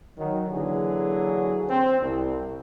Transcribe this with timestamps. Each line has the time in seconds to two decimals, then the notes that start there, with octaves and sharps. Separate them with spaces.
0.18 D#3 F#3
0.49 D3 E3 F#3 A#3 G#4
1.69 C4
2.01 C2